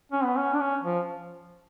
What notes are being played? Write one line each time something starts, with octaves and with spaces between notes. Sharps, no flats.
C#4
B3
C#4
D4
C#4
F3